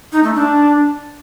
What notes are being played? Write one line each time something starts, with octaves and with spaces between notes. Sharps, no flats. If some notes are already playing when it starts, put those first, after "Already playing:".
D#4
A3
D4